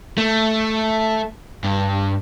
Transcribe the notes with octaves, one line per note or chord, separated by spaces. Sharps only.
A3
G2